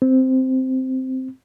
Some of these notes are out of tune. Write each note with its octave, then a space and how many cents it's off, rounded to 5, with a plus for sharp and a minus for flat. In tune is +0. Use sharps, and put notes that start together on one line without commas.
C4 -5